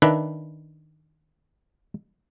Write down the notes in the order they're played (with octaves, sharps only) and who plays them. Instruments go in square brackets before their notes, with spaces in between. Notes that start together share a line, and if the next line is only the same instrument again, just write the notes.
[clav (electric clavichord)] D#3 D4 B4 E5